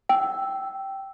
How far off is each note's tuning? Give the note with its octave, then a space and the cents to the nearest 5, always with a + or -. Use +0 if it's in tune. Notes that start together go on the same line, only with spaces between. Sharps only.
G5 -10 E6 +0